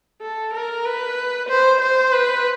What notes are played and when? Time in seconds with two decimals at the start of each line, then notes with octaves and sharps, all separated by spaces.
0.21 A4
0.54 A#4
0.86 B4
1.49 C5
1.81 C5
2.13 B4